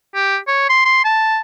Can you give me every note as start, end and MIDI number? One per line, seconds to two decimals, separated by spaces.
0.15 0.37 67
0.47 0.65 73
0.69 0.85 84
0.85 1.03 84
1.04 1.40 81